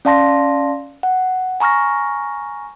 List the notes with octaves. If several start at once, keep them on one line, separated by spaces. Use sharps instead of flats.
C#4 D5 F5 A5 C6 A#6
F#5
G#5 A#5 C#6 F6 A#6